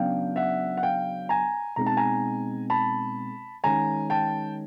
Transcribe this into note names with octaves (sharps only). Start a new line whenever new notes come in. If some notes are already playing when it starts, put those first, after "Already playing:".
Already playing: C#3 F#3 B3 D4 F5 G5
E5 F#5
F#5
F5 G5
G#5 A#5
B2 G#3 C4 D#4 A#5
A5
G#5 A#5
A5 B5
D#3 G#3 C#4 G#5 A#5
G5 A5